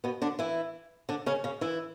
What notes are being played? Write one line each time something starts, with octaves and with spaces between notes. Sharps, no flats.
B2 B3
D3 D4
E3 E4
D3 D4
C#3 C#4
C#3 C#4
E3 E4